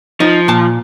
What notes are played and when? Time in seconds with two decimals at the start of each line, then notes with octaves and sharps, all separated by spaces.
0.20 F3 D#4
0.48 A#2 A5